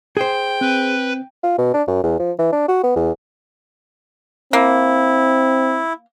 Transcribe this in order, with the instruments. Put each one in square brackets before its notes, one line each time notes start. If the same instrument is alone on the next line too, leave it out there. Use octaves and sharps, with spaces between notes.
[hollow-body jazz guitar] G#4 C5 [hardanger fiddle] G5
[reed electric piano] C4 [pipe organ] B4
[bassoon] F4
B2
D4
F#2
E2
F3
E3
D4
F#4
B3
E2
[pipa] A#3 [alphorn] C4 [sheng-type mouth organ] E4